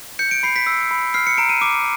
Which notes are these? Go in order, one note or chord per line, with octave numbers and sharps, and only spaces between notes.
G6 C#7
D7
B5 C7
B6
E6
B5
F6 C7
C#7
A#5 D7
D#7
D6